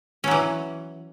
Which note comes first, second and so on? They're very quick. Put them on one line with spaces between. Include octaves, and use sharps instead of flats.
C#4 F#3 E3